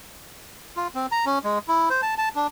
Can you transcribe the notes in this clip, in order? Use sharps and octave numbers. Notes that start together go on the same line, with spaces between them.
F4
C4
A#5
C#4
G#3
E4
C5
A5
A5
D4